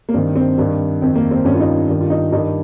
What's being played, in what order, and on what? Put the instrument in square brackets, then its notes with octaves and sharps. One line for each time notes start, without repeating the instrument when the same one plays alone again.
[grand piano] A#3
G2 D#3 C4
C4
G2 D#3
F2 D#3 C4
A#3
C4
G2 D#3 C#4
F4
D#4
G2 D#3
F4
D#4
G2 D#3 D#4